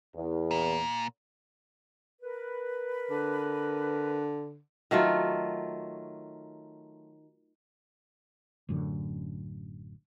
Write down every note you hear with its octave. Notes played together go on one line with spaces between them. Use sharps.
E2
A#2
A#4 B4
D3
D#3 F#3 A3 F4
A1 F#2 D3